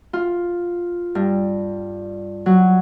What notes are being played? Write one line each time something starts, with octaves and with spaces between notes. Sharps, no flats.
F4
G2
F#3